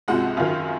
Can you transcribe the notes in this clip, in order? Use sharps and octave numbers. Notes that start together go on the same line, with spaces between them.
C#2 C3 F3 G#3 F#4 F#5
F#2 D#3 F#3 F4 F5